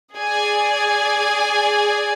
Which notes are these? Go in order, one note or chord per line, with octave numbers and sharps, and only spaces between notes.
G#4 D5 G#5